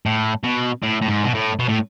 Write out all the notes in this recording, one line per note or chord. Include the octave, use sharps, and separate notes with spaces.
A2
B2
A2
A2
G#2
B2
A2
B2
A2